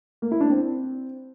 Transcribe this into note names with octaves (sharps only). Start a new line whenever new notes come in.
A#3
E4
D4
C4